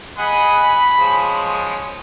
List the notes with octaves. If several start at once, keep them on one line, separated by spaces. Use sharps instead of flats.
G#4 D#5 F#5 B5
F3 G#3 C#4